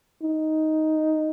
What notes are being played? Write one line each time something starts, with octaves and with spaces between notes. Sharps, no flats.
D#4